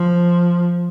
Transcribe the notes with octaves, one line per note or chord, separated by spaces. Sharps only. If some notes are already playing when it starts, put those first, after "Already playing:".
Already playing: F3